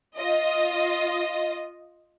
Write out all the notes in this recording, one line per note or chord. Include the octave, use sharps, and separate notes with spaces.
F4 D#5